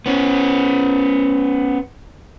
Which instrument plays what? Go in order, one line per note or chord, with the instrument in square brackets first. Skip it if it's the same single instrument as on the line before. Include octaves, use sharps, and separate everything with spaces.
[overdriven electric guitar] B3 C#4